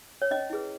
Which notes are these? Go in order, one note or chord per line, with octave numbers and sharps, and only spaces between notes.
C#5
C#4 D#5
E4 G#4 B4